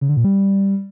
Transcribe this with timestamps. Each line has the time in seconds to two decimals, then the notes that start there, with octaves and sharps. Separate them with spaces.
0.01 C#3
0.09 D3
0.17 A#2
0.24 G3